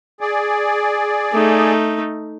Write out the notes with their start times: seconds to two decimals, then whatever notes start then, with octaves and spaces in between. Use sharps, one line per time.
0.21 G#4 D5
1.33 A3 D#4